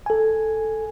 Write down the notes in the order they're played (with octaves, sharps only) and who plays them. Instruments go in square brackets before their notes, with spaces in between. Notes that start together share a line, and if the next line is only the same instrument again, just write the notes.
[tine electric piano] A4 G#5